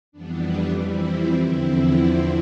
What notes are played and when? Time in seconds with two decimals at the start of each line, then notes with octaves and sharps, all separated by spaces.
0.12 F2 E3 G3 B3 D4
0.77 C4 E4
1.41 E2 D3 F3 C4 E4